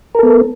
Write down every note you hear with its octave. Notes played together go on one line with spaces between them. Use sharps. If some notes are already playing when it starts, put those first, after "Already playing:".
B3 A4 A#4